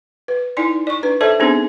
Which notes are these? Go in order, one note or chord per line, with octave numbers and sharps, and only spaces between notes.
B4
D#4 E4 D5 G#5 C6
D5 C#6
D4 B4
A4 C5 D5 E5 A5
B3 C4 D4 D#4 G#4 C5